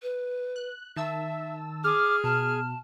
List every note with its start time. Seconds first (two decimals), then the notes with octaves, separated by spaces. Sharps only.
0.02 B4
0.56 F#6
0.96 D#3 E5 A5 E6
1.84 G#4 D6 F6
2.24 B2 A5